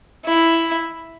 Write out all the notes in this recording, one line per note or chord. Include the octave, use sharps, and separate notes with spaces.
E4